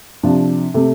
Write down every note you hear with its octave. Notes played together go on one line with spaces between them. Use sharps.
C3 F3 D4
C3 A3